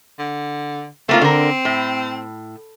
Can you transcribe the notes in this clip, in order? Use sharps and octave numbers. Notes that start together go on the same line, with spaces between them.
D3
A3 A#3 C4 F4
D3 A#4
A2